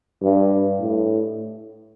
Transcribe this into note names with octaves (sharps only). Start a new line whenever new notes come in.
G2
A2